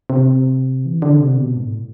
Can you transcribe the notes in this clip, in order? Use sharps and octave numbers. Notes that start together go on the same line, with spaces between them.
C3
E3
D3
C3
B2
G#2
A2